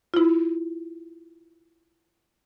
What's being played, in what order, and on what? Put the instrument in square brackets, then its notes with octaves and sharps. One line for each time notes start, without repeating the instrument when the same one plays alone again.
[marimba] E4 F4